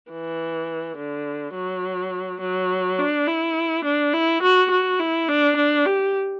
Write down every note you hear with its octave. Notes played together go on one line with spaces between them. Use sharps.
E3
D3
F#3
F#3
D4
E4
D4
E4
F#4
F#4
E4
D4
D4
G4